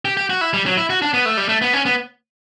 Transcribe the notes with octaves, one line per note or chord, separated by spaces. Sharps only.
G4
G4
F#4
E4
G3
F#3
E4
F#4
D4
B3
A3
G3
A3
B3
C#4
B3